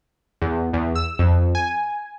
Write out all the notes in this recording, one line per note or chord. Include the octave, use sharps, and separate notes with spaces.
E2
E2
E6
F2
G#5